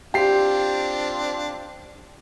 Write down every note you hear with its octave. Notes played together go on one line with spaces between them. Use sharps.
C4 D4 F4 G4 C7